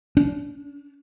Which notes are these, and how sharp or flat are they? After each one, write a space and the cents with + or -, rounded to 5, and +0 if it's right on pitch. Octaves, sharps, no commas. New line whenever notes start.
D4 -40